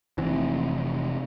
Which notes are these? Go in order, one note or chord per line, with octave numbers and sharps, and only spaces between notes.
F1 C3 E3